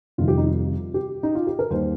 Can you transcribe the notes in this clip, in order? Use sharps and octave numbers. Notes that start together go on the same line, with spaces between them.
F1 F2 C3 D#3 G3 F4
G4
D#4
F4
G4
D#4
F4
G4
A#4
D#2 D#3 G3 C5